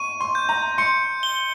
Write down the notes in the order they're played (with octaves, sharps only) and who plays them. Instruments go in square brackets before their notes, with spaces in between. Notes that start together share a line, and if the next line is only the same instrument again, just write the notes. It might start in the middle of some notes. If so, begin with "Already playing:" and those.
Already playing: [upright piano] C#6 [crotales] D#7
[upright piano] C6
[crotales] G6
[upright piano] A#5
[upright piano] C6 [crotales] C#7
[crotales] G7